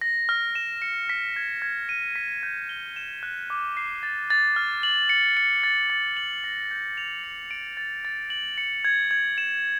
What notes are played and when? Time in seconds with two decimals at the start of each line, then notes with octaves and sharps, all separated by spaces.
0.01 A#6
0.29 F6
0.55 E7
0.82 C#7
1.09 B6
1.36 G#6
1.62 G#6
1.89 D#7
2.16 B6
2.43 G6
2.69 G7
2.96 E7
3.23 F#6
3.50 D6
3.77 C7
4.03 A6
4.30 A6
4.56 F6
4.83 F#7
5.09 C#7
5.37 C#7
5.64 A6
5.90 A6
6.17 F#7
6.44 A#6
6.71 G6
6.97 F7
7.24 C#7
7.51 D7
7.77 A6
8.05 A6
8.30 F#7
8.58 C#7
8.85 G#6
9.11 G#6
9.38 E7